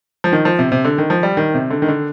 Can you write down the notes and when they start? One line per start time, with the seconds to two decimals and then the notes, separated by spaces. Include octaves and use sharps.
0.24 F3
0.32 D#3
0.45 F3
0.59 C3
0.72 C3
0.85 D3
0.98 D#3
1.10 F3
1.23 G3
1.37 D#3
1.54 C3
1.70 D3
1.82 D#3
1.88 D3